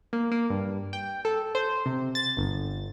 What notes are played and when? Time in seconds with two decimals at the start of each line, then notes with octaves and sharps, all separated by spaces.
0.13 A#3
0.31 A#3
0.50 G2
0.93 G5
1.25 A4
1.55 C5
1.86 C3
2.15 A6
2.37 G1